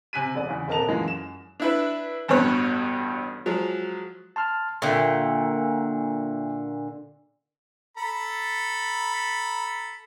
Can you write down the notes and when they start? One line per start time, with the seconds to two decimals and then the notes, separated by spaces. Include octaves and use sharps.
0.13 C3 G#5 F#6 B6 D#7
0.35 E1 D5
0.49 E2 C#3
0.68 D#1 C4 A#4 D#5 A5 F7
0.88 F#2 A#2 E3 F3 G#3
1.04 F#2 E7
1.60 D4 E4 B4
2.28 A1 G2 B2 C#5 F#6
3.46 F3 F#3 G#3
4.36 A5 C6 F6
4.82 A#2 D3 E5 G5 C#6
7.97 A4 A#5 B5